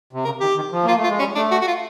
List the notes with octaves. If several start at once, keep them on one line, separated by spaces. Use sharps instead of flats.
C3
C#3 A#4
D#3 G4
D#3
F3
A#3 F4
A3
F4
G#3
G3 C#4
A3 D4
F#4
F#4
F4